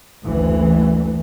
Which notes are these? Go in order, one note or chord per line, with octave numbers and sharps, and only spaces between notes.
F#1 D2 E3